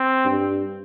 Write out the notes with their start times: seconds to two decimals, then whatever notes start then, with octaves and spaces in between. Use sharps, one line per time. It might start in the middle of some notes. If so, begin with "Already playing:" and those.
Already playing: C4
0.25 G2